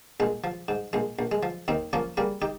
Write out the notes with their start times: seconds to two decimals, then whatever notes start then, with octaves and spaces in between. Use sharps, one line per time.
0.20 A#1 G#3
0.44 F3
0.68 G#2
0.93 A#1 G#3
1.19 A#1
1.32 G#3
1.43 F3
1.68 D#2 C4 D#4
1.93 F3 A#3 C#4
2.17 C#3 G3 A#3
2.42 D#4 G4